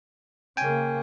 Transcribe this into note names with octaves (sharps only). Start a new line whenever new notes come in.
C#3 A#3 G5 G#5